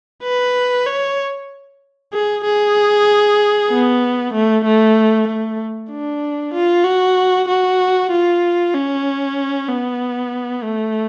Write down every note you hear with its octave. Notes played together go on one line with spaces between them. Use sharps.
B4
C#5
G#4
G#4
B3
A3
A3
A3
D4
F4
F#4
F#4
F4
C#4
B3
A3